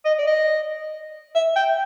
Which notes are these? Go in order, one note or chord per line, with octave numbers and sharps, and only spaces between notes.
D#5
D5
D#5
E5
G5